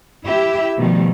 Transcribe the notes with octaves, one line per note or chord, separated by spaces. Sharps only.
E4 G4 E5
B2 D#3 F3 G3 A3